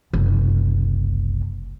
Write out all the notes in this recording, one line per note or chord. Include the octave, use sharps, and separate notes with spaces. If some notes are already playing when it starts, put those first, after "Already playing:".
F#1 C2